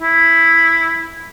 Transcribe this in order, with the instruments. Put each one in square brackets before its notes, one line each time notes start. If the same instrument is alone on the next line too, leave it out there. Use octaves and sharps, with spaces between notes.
[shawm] E4